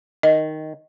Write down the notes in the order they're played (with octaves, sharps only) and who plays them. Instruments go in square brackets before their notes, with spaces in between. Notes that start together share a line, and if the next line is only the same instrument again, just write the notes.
[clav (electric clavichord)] D#3 [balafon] D#5